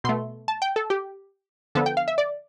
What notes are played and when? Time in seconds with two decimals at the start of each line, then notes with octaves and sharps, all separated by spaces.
0.04 B2 A3 C6
0.48 A5
0.62 G5
0.76 A4
0.90 G4
1.75 D3 F3 B3 A4
1.86 G5
1.97 F5
2.08 E5
2.18 D5